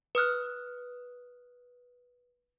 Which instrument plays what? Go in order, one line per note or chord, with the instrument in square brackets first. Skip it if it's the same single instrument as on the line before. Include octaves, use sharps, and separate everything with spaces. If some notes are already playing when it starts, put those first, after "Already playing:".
[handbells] B4 D#6 F6 F#6